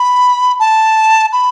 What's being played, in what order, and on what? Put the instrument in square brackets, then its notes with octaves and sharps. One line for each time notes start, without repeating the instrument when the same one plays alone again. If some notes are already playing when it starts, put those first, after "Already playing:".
Already playing: [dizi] B5
A5
B5